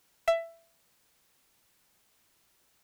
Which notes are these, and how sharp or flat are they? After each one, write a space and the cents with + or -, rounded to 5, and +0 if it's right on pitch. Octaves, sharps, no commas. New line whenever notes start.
E5 +15